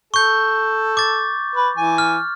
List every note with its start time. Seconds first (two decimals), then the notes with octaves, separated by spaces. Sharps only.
0.14 A4 C#6 G6
0.97 D6 A6
1.56 B4
1.77 E3 G#5
1.98 F6